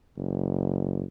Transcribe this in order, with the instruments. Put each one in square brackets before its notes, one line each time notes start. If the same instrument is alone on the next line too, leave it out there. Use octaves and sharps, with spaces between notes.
[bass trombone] F#1